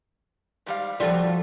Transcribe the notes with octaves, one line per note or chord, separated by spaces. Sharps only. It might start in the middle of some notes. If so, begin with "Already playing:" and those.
G#2 G3 F5
C#3 F3 G3 F4 F#4 A4